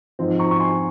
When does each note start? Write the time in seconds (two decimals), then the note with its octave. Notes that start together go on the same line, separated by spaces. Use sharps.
0.19 G#2 F3 C4
0.39 A#5 C#6
0.51 C#6
0.60 G#5 C6